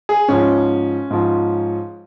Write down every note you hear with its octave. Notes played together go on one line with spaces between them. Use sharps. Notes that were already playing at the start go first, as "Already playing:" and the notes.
G#4
G#2 F3 C#4
G#2 F3